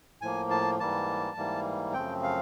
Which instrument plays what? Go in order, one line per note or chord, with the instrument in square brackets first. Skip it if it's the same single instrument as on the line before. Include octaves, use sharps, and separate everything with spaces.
[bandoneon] A2 F3 A#3 G#5
A5
G#2 E3 G3 A#3 A5
G#2 E3 G3 A#3
F#2 C#3 F3 A3 C4 G5
F5